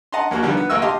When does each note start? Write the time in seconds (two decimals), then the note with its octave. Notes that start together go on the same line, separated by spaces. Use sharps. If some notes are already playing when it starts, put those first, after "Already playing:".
0.12 D#5 F#5 A5 A#5 C6
0.31 D#2 A#3 F#4
0.43 D3 D#3 F3 G3 A#3 B3
0.57 B3
0.70 D2 A#3 F4 D#5 C#6 E6
0.82 G4 D#5 F5 A5 C6